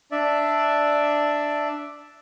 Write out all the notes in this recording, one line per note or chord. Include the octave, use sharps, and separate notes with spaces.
D4 D5 E5